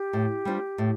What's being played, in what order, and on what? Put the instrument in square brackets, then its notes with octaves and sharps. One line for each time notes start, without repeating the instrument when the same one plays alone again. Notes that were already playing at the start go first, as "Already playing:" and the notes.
Already playing: [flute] G4
[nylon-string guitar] A2
G3 D4 F4 C5
A2